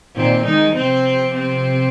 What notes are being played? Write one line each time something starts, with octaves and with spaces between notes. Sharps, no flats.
A#2 D#3 C4
D#3 G#3 D#4
C3 F3 C4
C4